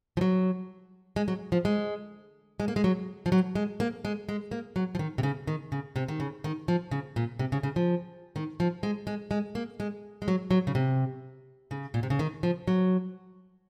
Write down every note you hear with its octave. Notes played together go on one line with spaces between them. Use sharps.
F3
F#3
G#3
F#3
F3
G#3
G#3
A#3
G#3
F#3
F3
F#3
G#3
A#3
G#3
G#3
A#3
F#3
F3
D#3
C3
C#3
D#3
C#3
C3
D#3
C#3
D#3
F3
C#3
A#2
C3
C#3
C#3
F3
D#3
F3
G#3
G#3
G#3
A#3
G#3
G#3
F#3
F#3
C#3
C3
C#3
A#2
C3
C#3
D#3
F3
F#3